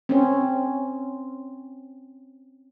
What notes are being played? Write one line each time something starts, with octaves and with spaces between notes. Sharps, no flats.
C4 C#4